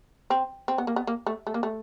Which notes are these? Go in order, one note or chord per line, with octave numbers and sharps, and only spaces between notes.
C4
C4
B3
A#3
B3
A#3
A3
A3
A#3
A3